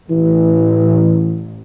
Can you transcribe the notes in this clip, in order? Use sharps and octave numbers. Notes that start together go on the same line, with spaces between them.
A1 E3